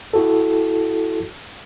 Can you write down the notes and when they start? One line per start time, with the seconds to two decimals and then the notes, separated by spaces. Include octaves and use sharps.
0.13 E4 F#4 A4